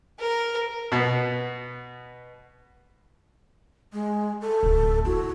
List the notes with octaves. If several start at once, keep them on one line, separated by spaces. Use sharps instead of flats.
A#4
B2 B3
G#3
A4
D1
E4 F#4